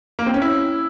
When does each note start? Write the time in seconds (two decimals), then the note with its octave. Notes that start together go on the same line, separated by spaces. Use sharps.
0.19 A#3
0.26 C4
0.34 C#4
0.42 E4